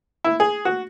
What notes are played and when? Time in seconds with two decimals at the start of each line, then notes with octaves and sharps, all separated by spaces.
0.24 E4
0.40 G#4
0.65 F#4